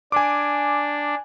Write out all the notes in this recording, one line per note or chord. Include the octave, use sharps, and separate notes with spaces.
D4 G#5 D6